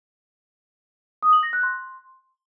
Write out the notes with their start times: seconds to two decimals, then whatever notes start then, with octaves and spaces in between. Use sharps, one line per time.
1.23 D#6
1.33 F#7
1.43 A#6
1.53 F#6
1.63 C6